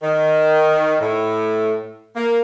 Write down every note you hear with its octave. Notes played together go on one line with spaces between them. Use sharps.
D#3
A2
A#3